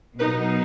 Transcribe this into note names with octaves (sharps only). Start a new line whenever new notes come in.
B2 F#3 B3 D#4 B4